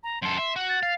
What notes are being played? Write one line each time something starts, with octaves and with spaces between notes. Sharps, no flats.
A#5
F#2 A4 C6
E5
F#4
A6
F5